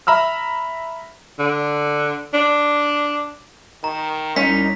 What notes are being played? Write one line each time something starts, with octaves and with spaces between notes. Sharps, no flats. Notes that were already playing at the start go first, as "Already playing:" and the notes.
E5 A#5 B5 E6 F6
D3
D4
D#3 A#5
C2 C#4 D#4 B6